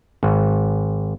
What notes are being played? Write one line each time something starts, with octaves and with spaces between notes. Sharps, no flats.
G#1